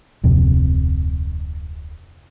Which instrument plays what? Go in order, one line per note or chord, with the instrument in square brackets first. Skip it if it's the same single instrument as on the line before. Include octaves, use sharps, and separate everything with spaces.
[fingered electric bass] D1 F2 C3